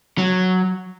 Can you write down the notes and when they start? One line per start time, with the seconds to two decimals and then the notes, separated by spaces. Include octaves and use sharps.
0.18 F#3